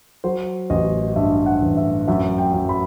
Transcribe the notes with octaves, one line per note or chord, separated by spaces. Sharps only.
F#3 C5
A1 D#5
G2 E5
F#5
A1
E5
F#2 E5
G5
F#2
B5